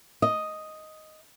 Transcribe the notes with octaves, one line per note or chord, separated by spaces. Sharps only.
D#5